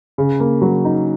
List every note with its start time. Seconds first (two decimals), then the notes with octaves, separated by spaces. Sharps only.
0.18 C#3
0.40 A#3
0.62 F#3
0.85 D#4